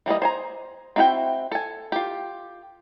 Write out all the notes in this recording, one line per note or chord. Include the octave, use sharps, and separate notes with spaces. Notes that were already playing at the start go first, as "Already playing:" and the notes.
E3 G3 A#3 D#5
C5 G#5 A#5
C4 E4 F#4 E5 G5
A4 G#5
F4 G4